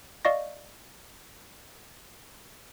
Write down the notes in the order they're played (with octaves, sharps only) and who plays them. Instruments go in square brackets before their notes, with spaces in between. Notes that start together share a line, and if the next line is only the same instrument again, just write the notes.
[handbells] D5 D#5 F5 C#6 A#6